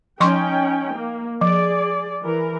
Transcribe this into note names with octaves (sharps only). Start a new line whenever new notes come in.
F3 C#4 D#4 G5 C6 C#6
A#3
F3 G#4 D5
E3 A#4